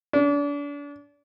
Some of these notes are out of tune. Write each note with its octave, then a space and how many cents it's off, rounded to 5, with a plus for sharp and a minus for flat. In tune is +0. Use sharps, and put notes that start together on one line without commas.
D4 -35